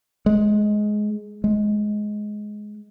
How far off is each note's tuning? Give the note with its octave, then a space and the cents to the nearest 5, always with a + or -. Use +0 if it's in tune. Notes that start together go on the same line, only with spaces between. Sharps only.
G#3 +15
G#3 +15